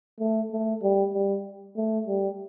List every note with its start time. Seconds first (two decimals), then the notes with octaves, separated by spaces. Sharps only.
0.20 A3
0.52 A3
0.83 G3
1.14 G3
1.77 A3
2.07 G3